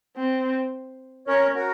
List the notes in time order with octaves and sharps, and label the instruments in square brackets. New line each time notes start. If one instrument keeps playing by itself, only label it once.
[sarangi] C4
[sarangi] C#4 [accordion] A#4 C#5
[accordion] F#4 A#4